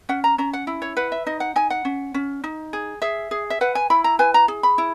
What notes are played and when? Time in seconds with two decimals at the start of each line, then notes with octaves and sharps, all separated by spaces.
0.09 C#4 F#5
0.24 A#5
0.38 C#4 A#5
0.53 F#5
0.67 E4
0.82 C#5
0.97 B4 F#5
1.12 E5
1.26 D#4 D#5
1.40 F#5
1.56 D#4 G#5
1.70 F#5
1.85 C#4
2.14 C#4
2.44 D#4
2.73 G#4
3.02 G#4 E5
3.31 G#4
3.50 E5
3.61 B4 F#5
3.75 G#5
3.90 E4 B5
4.04 A#5
4.19 B4 G#5
4.34 A#5
4.48 G#4
4.63 B5
4.78 E4